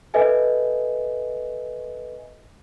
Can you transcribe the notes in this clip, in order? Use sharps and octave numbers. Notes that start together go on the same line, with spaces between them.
A4 B4 D#5 E5 G#5